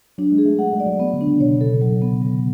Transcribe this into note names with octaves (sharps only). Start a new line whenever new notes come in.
F#3 D4
G#3
G#4
A3
A3 F#5
G#3
D5
F#3
F#3 B3
D3
D4
C#3
B2 C#5
B2
A4
C#3
B2 F#3
B2
D3 B3
C#3
D3 F#3